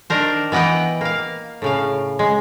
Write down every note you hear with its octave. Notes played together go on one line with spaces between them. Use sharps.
D#3 D4 A#4 C5
E3 B3 D#5 F#5 G5
A#3 F5
A2 C#3 F5
G#3